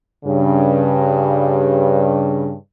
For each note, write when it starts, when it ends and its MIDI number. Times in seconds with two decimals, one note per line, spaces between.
0.25 2.53 43
0.25 2.53 49